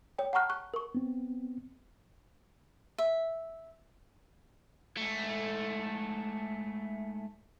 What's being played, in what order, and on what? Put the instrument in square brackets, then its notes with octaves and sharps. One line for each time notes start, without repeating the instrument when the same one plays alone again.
[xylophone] C#5 G5
F#5 A5 A#5 C#6 F6 F#6
C#6 F#6
A#4 C#6
[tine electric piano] B3 C4
[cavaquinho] E5
[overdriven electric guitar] G#2 A3